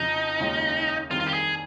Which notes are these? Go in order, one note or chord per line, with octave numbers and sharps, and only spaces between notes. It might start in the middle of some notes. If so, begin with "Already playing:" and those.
Already playing: F2 C#3 F3 D#4
D#2 C#3 G#3 C#4 F4
F2 D#3 G3 C4 D#4 F4
F4
G4
G#4